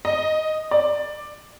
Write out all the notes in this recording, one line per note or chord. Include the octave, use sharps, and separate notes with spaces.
D#5
D5